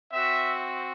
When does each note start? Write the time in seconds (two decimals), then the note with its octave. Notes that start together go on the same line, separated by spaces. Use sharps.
0.13 C4 F#4 E5